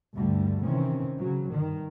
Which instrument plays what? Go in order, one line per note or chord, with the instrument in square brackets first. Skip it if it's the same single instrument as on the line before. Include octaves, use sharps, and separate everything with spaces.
[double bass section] D2 G2 D3 G3 A3
C3 D#3 E3 C4 C#4
C#3 F#3
G2 D#3